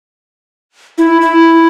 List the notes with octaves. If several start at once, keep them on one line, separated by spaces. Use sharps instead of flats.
E4
E4